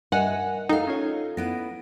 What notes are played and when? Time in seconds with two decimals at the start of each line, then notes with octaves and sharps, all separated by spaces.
0.12 G2 A#4 D#5 E5 F#5 G#5
0.69 D#4 A4 F5 G5
0.87 C#4 F4 C#5
1.37 B3 E4 B4 A#6 D7